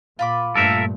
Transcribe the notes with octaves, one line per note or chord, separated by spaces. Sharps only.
A#2 F4 B5 D6
G2 A#2 A3 A4 A#4 E5